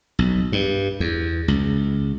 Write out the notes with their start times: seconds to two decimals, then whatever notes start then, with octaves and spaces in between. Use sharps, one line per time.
0.19 B1
0.52 G2
1.00 E2
1.48 C#2